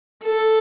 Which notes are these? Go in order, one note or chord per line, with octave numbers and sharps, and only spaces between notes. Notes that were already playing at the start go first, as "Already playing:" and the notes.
A4